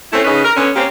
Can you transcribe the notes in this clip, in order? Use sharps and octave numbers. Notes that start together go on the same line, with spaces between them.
A3 C4 C#4 E4
C#3 C#4 D#4 B4
A#4
D3 B3 C#4
A#3 C4 C#4 G4